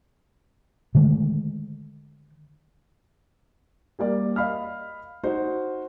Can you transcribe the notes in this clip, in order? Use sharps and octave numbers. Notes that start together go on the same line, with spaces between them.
D3 D#3 G#3 A3
G3 A#3 D5
D#5 F5 B5 F6
D#4 F#4 C5